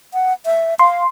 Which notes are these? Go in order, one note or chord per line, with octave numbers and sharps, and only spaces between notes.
F#5
E5
F5 C6